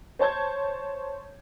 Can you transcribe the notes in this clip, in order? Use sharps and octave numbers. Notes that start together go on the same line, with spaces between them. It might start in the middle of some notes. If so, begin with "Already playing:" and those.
C5 C#5 A5 G6 G#6